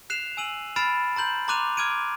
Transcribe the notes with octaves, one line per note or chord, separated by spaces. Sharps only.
F#6 C7 E7 F7
G#5 E6 D#7 F#7
B5 F6 A6 C7 D7 E7
A#5 C6 G6 F#7
A#5 C6 D6 F#6 D#7 F7
D6 F6 G#6 D7 D#7